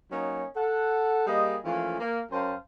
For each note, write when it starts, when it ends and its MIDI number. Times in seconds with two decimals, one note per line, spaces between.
0.11 0.45 54
0.11 0.45 58
0.11 0.45 61
0.11 0.45 63
0.56 1.23 69
0.56 1.23 78
1.27 1.57 55
1.27 1.57 58
1.27 1.57 68
1.27 1.57 75
1.64 2.00 52
1.64 2.00 53
1.64 2.00 57
1.64 2.00 58
1.64 2.00 61
1.64 2.00 65
2.00 2.21 58
2.31 2.54 42
2.31 2.54 61
2.31 2.54 72
2.31 2.54 77
2.31 2.54 79
2.31 2.54 81